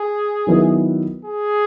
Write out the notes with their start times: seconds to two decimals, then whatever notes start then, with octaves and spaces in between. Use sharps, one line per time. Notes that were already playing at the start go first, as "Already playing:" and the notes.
Already playing: G#4
0.47 D#3 F#3 B3 E4 B4
1.25 G#4